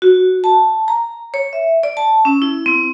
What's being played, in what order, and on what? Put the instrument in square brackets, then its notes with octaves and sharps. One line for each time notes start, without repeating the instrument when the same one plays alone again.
[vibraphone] F#4
A5
A#5
C#5
E5
D5
A5
C#4
E4
C4